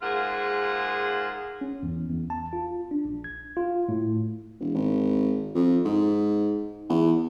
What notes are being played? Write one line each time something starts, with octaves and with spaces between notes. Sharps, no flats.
G#2 A#3 F4 G#4 F#5
C#4
E2
E2
A5
F4
D4
A#1
G#6
F4
A2
E1
G#1
F2
G#2
E2